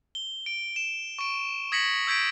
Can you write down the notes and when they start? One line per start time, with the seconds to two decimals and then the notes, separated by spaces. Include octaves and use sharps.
0.15 G7
0.46 D7
0.76 E7
1.19 C#6 D7
1.72 D#6 G#6 A#6 B6 C#7 F#7
2.07 E6 G6 G#6 B6 D7